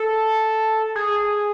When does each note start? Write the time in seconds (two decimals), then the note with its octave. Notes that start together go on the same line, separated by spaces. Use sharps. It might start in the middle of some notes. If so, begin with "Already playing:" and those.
Already playing: A4
0.96 G#4